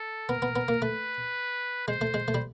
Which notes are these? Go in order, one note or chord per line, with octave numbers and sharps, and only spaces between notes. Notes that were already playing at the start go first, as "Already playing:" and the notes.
Already playing: A4
B3 A#4
B3
B3
A#3
A3 B4
G#3 C5
A3
G#3
A3
G3